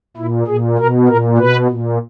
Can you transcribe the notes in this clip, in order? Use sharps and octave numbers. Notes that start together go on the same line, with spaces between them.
A#2 E4
A#2 G#4
B2 A#4
A#2 A#4
B2 B4
A#2